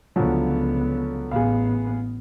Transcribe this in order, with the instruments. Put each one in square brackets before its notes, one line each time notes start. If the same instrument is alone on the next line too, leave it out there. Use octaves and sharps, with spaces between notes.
[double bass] C#2 B3 [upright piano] D3 F3 F#3
[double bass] A1 B3 [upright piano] G#4 F5